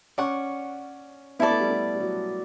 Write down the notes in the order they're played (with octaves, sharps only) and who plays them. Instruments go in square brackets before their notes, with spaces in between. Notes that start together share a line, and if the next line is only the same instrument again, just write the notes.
[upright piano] C#4 [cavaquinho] D5 F#5 C#6
[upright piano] B3 [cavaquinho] E4 A4 D5
[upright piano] A3
G3
A3
G3
F#3